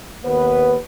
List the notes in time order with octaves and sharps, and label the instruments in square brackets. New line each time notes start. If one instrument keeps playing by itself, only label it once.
[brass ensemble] D#2 B3 B4